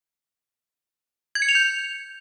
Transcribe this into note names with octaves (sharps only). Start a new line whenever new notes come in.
G#6
C#7
F7
G6